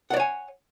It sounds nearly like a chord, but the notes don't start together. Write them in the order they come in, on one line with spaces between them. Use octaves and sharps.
F#5 D5 C#5 G#5